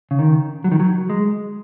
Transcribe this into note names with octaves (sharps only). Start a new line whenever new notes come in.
C#3
D#3
F#3
D#3
F#3
G#3